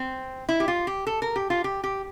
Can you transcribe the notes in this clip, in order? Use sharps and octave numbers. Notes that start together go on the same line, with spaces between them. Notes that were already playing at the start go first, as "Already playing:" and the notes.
Already playing: C4
E4
G4
F4
G4
A4
A#4
G4
F4
G4
G4